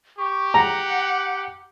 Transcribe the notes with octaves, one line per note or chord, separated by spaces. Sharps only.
G4 C#6
F#5 A#5